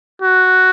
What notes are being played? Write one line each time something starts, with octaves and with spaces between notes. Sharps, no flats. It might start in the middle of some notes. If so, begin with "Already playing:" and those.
F#4